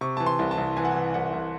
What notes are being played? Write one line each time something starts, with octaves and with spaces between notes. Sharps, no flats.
C3 C#6
E3 A5
C6
C2
A5
C2
E3 G#5
F#5
E3 G#5
C2 F#5
C2